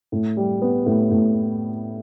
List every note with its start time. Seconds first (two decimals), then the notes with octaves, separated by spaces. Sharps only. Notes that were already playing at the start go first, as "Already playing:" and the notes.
0.12 A2
0.37 G3
0.62 B3
0.86 A2
1.11 A2